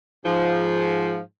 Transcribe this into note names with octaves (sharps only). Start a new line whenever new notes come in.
G#2 F3